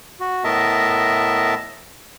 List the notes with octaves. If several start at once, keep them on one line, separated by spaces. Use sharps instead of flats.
F#4
A2 B3 A#4 D#5 E5 A5